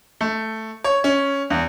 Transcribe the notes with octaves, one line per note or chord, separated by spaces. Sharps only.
A3
C#5
C#4
E2